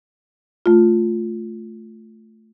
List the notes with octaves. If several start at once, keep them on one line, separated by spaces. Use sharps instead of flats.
A3 F4